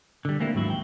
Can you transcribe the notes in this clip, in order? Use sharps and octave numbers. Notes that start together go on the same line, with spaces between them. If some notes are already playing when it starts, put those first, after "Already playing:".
D3 G3
A3 A#3 C4 E4
D#2 G#2 F#3 E4
G5